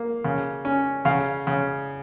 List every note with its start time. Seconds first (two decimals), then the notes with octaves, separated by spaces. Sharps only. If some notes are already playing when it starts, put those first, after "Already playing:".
Already playing: A#3
0.24 C#3
0.65 C#4
1.05 C#3 F5
1.47 C#3